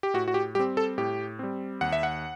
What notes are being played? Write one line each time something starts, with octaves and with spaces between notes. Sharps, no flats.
G4
A2 F#4
F#4
G4
G3 C4 G4
A4
A2 G4
G3 C4
D#2 F#5
E5
F#5